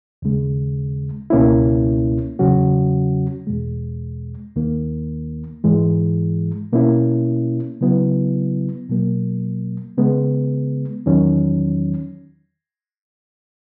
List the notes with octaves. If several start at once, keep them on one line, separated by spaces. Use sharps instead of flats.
D#2 C#3 G#3
C#2 B2 A#3 C#4 E4
E2 C#3 F#3 C#4 F#4
E2 B2 G#3
D#2 D#3 A#3
G#2 E3 G#3
B2 A#3 C#4 E4
C#3 F#3 B3 E4
B2 F#3 A#3
C#3 G#3 B3
E2 D#3 F#3 C#4